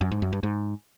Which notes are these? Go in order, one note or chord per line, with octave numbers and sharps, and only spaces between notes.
F#2
G#2
F#2
G2
G#2